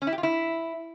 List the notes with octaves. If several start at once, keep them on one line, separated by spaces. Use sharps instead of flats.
C#4
E4
G4
F4
E4